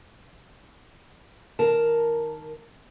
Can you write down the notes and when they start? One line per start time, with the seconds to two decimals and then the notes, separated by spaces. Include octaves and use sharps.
1.59 D#3 A#4 A5